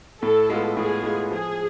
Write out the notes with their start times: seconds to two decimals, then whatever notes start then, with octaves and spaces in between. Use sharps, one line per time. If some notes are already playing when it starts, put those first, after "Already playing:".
0.22 A2 A4
0.50 G#3 B3 F4
0.76 A2 G#4
1.04 G#3 B3 F4
1.31 F3 G#4